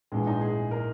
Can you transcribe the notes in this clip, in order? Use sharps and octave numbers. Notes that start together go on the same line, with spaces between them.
A#1 G#2 E3 G#3
D#4
G#4
A#4